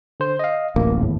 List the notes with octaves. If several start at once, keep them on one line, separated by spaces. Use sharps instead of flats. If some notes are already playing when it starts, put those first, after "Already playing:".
D3 C5
D#5 F5
D1 A1 A#3
G#1 E2 A2